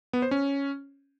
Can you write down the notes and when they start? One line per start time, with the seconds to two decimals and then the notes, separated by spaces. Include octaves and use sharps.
0.13 B3
0.22 C5
0.31 C#4